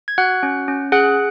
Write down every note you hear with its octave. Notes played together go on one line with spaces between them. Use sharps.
G#6
F#4 F#5 F#6
C#4
C#4
G#4 F#5 F#6